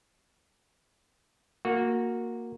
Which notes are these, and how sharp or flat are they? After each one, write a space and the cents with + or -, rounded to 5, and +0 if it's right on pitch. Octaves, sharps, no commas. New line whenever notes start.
A#3 -5 F#4 -20